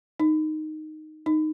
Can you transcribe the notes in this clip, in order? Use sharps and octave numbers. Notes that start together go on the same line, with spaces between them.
D#4
D#4